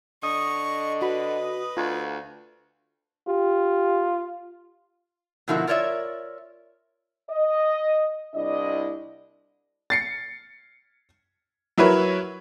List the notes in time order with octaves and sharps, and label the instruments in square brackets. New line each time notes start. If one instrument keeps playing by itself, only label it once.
[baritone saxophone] D3 [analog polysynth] D#5 [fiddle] C#6
[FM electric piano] F#4 B5 [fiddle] B4
[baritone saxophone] D2 [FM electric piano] F4
[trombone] F4 [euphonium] G4
[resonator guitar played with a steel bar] B2 D3 F3 A#3 E4 F#4
F4 A#4 C#5 D5 E5
[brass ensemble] D#5
C2 D4 E4 D5 D#5
[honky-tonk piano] A6 C7 C#7
F#3 E4 A#4 B4 C#5